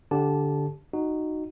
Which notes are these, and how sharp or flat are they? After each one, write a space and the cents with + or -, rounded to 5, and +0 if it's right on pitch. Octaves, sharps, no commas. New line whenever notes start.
D3 -10 G4 +0 A5 -15
D#4 -10 F#4 +0